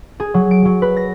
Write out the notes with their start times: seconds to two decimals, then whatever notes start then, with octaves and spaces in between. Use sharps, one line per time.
0.20 G#4
0.34 F#3
0.51 D7
0.65 F#3
0.82 B4
0.97 A#6